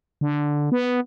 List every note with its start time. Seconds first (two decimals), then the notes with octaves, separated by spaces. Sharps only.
0.21 D3
0.72 B3